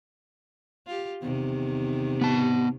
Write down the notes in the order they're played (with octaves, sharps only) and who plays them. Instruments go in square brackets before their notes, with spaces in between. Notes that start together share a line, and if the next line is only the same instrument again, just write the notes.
[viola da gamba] F4 G4
E2 C3 D#3
[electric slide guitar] B3 A5